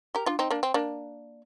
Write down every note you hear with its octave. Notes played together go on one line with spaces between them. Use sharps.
G4 A#4
D4 F4
C4 D#4
A#3 D4
C4
A#3 D4